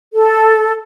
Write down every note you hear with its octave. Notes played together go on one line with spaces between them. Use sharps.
A4